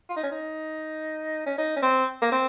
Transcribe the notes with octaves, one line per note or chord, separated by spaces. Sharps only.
F4
D#4
C#4
D#4
C#4
D#4
C#4
C4
A#3
C4